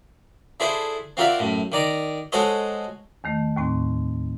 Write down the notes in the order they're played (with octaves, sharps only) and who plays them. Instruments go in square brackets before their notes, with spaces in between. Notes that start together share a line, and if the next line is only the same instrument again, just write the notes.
[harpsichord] D4 E4 G#4 A4 C5
C4 F4 F#4 A#4 D5 E5
F#2 A2
D#3 D5 A#5
G#3 F#4 A4 C5 C#5 D#5
[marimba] E2 D#3 A3
D#2 A2 C4